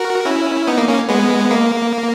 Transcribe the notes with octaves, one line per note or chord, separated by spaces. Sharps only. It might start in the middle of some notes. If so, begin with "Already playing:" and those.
Already playing: F#4 A#4
C#4 E4
B3 D#4
A#3
A#3 C#4
G#3 B3
A#3